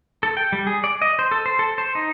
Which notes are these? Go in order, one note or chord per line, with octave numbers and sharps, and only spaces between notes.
A4
G5
G3
G#4
D5
D#5
C5
A4
C5
A4
C5
D#4